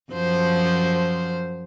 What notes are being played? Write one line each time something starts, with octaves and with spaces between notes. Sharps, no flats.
F#2 F3 C5